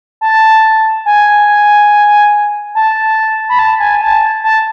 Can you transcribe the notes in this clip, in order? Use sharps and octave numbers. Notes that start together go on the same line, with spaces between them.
A5
G#5
A5
B5
A5
G#5
A5
A5